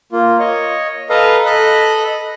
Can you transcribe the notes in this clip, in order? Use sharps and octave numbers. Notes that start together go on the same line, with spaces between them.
A#3 F4
C#5 D#5
A4 B4 D#5 F5 A#5
A4 D#5 B5 F#6